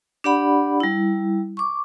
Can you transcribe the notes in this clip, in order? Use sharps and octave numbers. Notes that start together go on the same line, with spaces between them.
D4 G4 D5 F#5 B5
G3 E4
C#6 D6